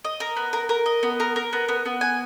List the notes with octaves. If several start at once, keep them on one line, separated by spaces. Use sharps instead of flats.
D#5
A#4
B3
A#4
A#4
D#5
B3
A#4
A#4
B3
B3
B3
G#5